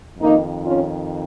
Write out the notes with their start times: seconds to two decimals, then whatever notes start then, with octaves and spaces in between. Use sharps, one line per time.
0.19 F2 D#3 A#3 D#4
0.65 C#4 F4